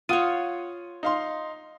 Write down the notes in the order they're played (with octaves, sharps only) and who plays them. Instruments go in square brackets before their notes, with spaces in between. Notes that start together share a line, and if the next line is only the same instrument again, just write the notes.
[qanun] F4 C#5 [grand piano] F#5 D#6 D#7
[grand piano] D#4 F5 C6